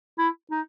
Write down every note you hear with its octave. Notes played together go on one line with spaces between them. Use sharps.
E4
D#4